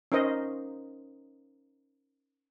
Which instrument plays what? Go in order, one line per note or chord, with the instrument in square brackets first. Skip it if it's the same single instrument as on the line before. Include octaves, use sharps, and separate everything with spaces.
[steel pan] C#4 D#4 A#4 C5 D#5